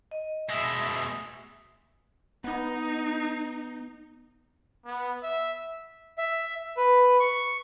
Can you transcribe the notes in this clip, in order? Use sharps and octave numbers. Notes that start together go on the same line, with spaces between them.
D#5
B2 G#3 E5 D#6
B3 D#4
B3
E5
E5
B4
C#6